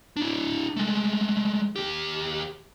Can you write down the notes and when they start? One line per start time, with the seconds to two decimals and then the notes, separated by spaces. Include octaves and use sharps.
0.17 D4 E4
0.76 G#3 A3
1.76 D#2 G4